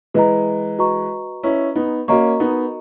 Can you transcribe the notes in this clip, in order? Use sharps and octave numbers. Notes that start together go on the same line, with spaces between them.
E3 G#3 B4 D#5 A#5
F#4 B4 D#5 A#5 C#6
C#4 E4 F#4 B4 D#5 A#5 C#6
B3 D#4
A#3 C#4 F#4 A#4 D#5 A#5 C#6
B3 D#4